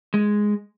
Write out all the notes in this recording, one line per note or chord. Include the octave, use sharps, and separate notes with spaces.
G#3